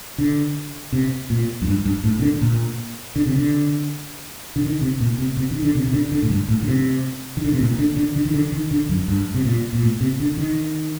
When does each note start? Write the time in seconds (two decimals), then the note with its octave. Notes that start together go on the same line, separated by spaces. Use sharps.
0.18 D3
0.92 C3
1.30 A#2
1.62 F#2
1.67 G2
1.85 G2
2.04 A2
2.19 C3
2.22 D3
2.41 A#2
3.16 D3
3.26 C3
3.37 D3
4.56 D3
4.64 D#3
4.81 C3
5.00 A#2
5.18 C3
5.37 C3
5.51 D#3
5.62 D3
5.75 C3
5.86 C3
5.93 D3
6.12 D3
6.22 A2
6.30 G2
6.48 A2
6.62 D3
6.68 C3
7.37 D#3
7.45 D3
7.53 C3
7.61 A#2
7.79 D3
7.97 D3
8.16 D3
8.25 D#3
8.34 D3
8.52 D#3
8.71 D3
8.89 F#2
9.08 G2
9.35 C3
9.45 A#2
9.73 A#2
9.83 A2
10.01 C3
10.20 D3
10.37 D#3